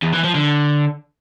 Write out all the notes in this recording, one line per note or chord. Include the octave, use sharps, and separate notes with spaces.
E2
E3
F3
D3